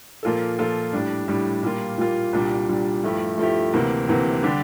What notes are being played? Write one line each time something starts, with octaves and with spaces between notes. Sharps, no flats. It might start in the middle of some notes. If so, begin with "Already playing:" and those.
A#2 F3 A#3 F4 A4
A#2 F3 A#3 F4 A4
A2 G3 D4
A2 G3 D4
A#2 G3 A#3 F4
A#2 G3 A#3 F4
C2 A#2 G3 D4
C2 A#2 G3 D4
G2 F3 A3 E4 G4
G2 F3 A3 E4 G4
D2 C3 E3 A#3
D2 C3 E3 A#3
D3 G3 D4 G4